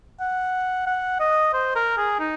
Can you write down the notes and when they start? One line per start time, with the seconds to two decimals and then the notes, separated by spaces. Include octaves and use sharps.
0.20 F#5
0.87 F#5
1.20 D#5
1.53 C5
1.75 A#4
1.97 G#4
2.19 D#4